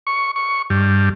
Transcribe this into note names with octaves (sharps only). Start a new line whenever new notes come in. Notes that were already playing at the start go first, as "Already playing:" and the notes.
C#6
C#6
G2